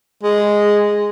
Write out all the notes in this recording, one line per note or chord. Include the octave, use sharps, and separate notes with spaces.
G#3